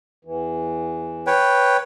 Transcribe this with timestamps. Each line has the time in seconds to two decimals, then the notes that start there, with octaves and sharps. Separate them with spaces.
0.25 E2 E3
1.27 B4 C#5 G5